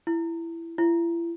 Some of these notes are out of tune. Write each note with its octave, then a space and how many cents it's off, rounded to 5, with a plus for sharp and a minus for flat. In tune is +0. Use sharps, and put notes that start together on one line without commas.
E4 +15
E4 +40